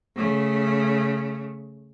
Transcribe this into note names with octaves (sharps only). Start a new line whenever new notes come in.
C#3 A3